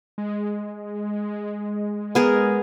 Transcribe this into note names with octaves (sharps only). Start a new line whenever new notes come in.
G#3
B3 G#4 A#4